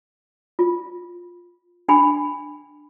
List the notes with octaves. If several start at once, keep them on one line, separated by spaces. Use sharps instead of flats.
F4
D4 G5 G#5 B5